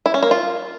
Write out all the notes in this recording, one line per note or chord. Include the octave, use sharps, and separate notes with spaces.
E4
C#4
A#3
F4